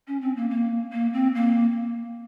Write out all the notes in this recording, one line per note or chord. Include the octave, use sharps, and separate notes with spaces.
C#4
C4
A#3
A#3
A#3
C4
A#3